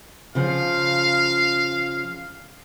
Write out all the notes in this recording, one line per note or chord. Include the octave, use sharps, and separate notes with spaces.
C#3 F3 F5